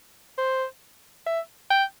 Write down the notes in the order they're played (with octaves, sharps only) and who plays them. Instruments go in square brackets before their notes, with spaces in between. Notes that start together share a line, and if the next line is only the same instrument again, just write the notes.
[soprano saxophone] C5
E5
G5